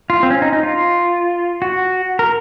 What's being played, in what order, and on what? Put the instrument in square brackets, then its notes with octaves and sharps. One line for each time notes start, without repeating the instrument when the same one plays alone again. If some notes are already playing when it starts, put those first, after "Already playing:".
[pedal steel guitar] F4
C4
C#4
D#4
D#4
F4
F#4
A#4